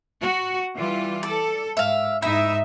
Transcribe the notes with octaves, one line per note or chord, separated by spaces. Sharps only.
F#4
E3 G3 F4
A4 D5
G#2 E5 F5
G#2 D#4 E4 E5